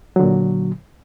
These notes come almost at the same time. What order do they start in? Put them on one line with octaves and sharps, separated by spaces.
F#3 D3 A#2